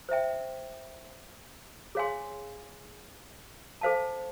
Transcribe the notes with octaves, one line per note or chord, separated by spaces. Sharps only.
C5 E5 G5
G#4 C#5 F5 G#5 C6
A4 C5 F5 A5